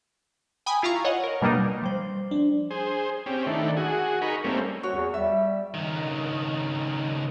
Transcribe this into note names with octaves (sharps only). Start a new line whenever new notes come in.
G5 G#5 B5 D#6
E4 F4 F5 A#5 C#6
C#5 D#5 F#5
A#4
B2 G3 A#3 D4 D#4
F3 G3 C5
D4
G#4 C5
C4 C#4 G4
D#3 A3 D4 E4
F#4 G#4
D#4 G#4 A#4 B5 C#6
G3 A3 A#3 C4 C#4
F#4 C#5
E2
G3 E5
C#2 D#3